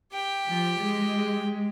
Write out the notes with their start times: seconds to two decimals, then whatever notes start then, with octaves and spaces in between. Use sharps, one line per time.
0.13 G4 G5
0.48 F3
0.80 G#3